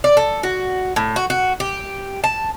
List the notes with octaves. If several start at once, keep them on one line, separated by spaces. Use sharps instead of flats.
D5
A4
F#4
A2
F#4
F#4
G4
A5